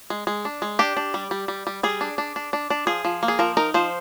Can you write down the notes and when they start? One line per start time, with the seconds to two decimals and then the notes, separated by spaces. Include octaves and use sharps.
0.10 G#3
0.27 G#3
0.45 D4
0.62 G#3
0.79 D4 G4
0.97 D4
1.14 G3
1.31 G3
1.48 G3
1.67 G3
1.83 G3 G#4
2.01 D4
2.18 D4
2.36 D4
2.53 D4
2.70 D4
2.87 F3 G#4
3.05 F3
3.23 A#3
3.28 G#4
3.39 F3 A#4
3.57 D#4 A#4
3.74 F3 C5